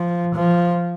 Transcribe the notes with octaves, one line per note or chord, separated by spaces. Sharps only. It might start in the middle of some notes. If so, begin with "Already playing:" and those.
Already playing: F3
F3